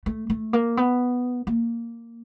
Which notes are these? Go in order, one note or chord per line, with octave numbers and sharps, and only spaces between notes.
A3
A3
A#3
B3
A#3